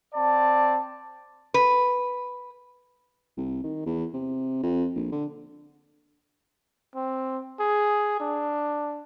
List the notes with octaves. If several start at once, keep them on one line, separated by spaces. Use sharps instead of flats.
C4 D5 A5
B4
C2
D#3
E2
C3
F2
A#1
D3
C4
G#4
D4